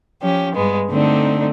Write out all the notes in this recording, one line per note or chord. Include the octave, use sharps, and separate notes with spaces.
F3 C#4 G4
G2 G#3 B3
D3 A3 C4 D4 D#4